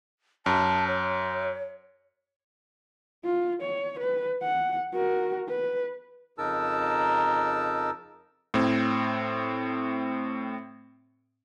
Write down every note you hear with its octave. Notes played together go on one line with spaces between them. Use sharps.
F#2 A5
C#5
F4
C#5
B4
F#5
F#4 A#4
B4
F2 C#3 D#4 A#4 A5 E6
A2 C4